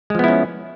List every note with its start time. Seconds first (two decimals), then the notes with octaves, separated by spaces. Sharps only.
0.10 G#3
0.15 F3
0.19 B3
0.24 E4
0.28 C#4